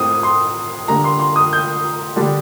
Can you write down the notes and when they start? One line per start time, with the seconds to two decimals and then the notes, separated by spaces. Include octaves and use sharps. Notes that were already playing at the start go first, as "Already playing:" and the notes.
Already playing: A2 C4 D#6
0.23 C6
0.88 D3 G3 A#3 D4 A#5
1.04 C6
1.19 C6
1.36 D#6
1.53 G6
2.16 D3 G3 D4